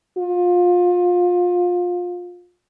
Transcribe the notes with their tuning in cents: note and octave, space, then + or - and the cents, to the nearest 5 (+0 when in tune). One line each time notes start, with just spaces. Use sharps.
F4 +25